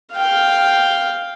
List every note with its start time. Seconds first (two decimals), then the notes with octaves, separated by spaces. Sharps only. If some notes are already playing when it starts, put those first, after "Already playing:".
0.12 F5 G5